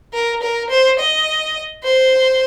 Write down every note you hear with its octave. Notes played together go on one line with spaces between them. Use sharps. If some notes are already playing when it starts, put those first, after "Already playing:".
A#4
A#4
C5
D#5
C5